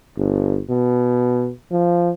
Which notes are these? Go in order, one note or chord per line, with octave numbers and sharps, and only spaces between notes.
G1
B2
F3